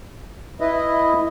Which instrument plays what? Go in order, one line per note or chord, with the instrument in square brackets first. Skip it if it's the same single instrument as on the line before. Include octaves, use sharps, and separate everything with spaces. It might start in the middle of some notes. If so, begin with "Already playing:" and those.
[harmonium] E4 B4 D#5